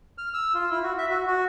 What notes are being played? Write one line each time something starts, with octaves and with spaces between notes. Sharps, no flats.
F6
E6
F4
E4
F#4
E5
F#4
F#4